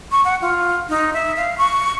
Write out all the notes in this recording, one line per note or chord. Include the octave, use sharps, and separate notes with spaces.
C#6
F#5
F4
D#4
E5
F5
C#6